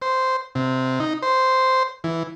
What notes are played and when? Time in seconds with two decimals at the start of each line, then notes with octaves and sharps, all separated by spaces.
0.02 C5
0.55 C3
1.00 D#4
1.22 C5
2.04 E3